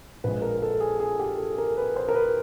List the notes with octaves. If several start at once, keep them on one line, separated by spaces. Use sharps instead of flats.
A#1 A#2 F3 G#3 B4
A#4
A4
G#4
G#4
G4
A4
A#4
B4
C5
A#4
B4